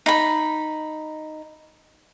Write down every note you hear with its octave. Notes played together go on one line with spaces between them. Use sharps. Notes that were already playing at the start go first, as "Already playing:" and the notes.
D#4 B5